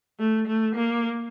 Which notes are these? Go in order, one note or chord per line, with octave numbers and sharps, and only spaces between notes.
A3
A3
A#3